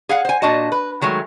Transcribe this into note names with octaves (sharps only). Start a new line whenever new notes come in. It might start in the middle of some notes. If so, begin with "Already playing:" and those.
G#4 F5 F#5
C5 G#5
A#2 D4 F#4 D#5 A5
B4
D#3 F#3 G#3 A3